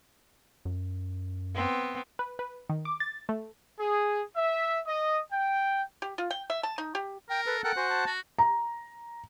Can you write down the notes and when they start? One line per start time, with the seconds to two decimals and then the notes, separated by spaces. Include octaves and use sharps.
0.65 F#2
1.54 B3 C4
2.19 B4
2.39 B4
2.69 D#3
2.85 D6
3.00 A6
3.29 A3
3.79 G#4
4.36 E5
4.87 D#5
5.32 G5
6.02 G4
6.18 F4
6.30 G5
6.50 E5
6.63 A5
6.78 D#4
6.95 G4
7.30 A#4 G5
7.46 A4 B4
7.64 A4 A#4 F#5 G5
7.76 F#4 C5 G#5
7.89 A5
8.06 F#4
8.39 A#5